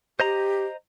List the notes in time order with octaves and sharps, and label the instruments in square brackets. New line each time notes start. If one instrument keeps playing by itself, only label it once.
[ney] G4 [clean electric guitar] C5 D#5 A#5